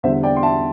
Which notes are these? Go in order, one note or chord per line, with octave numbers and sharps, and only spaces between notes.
E2 D3 G3 C5 E5
D5 G5
C6
E5 A5